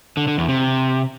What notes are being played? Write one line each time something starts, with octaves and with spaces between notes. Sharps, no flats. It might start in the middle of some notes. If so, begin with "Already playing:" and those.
D3
D3
E2
C3